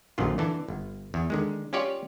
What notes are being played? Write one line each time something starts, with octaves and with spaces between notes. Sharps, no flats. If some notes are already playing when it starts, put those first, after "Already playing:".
A#1 F#2 D3 D#3 F4
D3 E3 A5
G1
E2
D3 D#3 G#3
C#4 F4 G4 C#5 D5